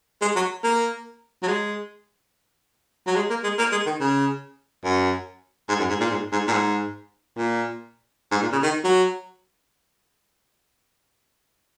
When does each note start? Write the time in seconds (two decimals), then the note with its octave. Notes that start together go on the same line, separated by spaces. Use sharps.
0.21 G#3
0.35 F#3
0.63 A#3
1.42 F#3
1.48 G#3
3.06 F#3
3.15 G#3
3.30 A#3
3.43 G#3
3.58 A#3
3.72 G#3
3.86 D#3
4.00 C#3
4.84 F#2
5.68 G#2
5.79 F#2
5.89 G#2
6.00 A#2
6.10 G#2
6.32 G#2
6.47 A#2
6.52 G#2
7.37 A#2
8.31 G#2
8.42 A#2
8.52 C#3
8.63 D#3
8.84 F#3